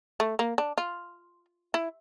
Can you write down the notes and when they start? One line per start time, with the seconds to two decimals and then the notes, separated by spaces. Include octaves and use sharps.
0.20 A3
0.39 A#3
0.58 D4
0.78 F4
1.74 E4